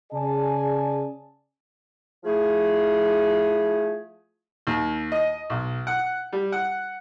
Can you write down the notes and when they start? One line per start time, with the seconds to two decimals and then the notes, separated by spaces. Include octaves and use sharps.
0.12 C#3 G#4 D5 G#5 A5
2.24 F3 A3 E4 G#4
4.67 D#2
5.12 D#5
5.50 B1
5.87 F#5
6.33 G3
6.52 F#5